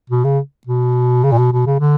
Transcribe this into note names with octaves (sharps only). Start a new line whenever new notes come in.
B2
C#3
B2
C#3
A#2
B2
B2
C#3
D3